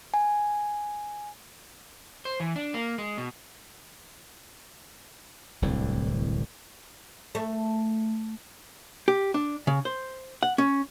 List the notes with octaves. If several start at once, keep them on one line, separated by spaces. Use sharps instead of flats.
G#5
C5
E3
D4
A#3
G#3
B2
D1 C2 A2 D3
A3
G4
D4
C#3
C5
F#5
C#4